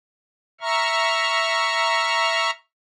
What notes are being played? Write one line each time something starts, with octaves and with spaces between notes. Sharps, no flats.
E5 A#5 C#6 F6